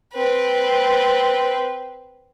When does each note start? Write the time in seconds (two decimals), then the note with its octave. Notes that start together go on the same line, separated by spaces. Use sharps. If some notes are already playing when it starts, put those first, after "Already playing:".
0.13 C4 B4